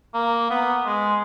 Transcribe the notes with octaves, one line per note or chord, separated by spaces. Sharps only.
A#3
B3
G#3